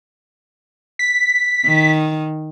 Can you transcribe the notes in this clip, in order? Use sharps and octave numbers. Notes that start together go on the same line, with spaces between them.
B6
D#3